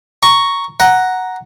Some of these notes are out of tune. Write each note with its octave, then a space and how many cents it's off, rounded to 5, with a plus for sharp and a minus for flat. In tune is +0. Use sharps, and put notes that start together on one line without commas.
A#5 +0 C#6 +0
F#5 +0 A#5 +5